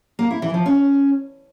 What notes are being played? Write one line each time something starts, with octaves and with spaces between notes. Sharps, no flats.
A#3
E4
E3
F3
C#4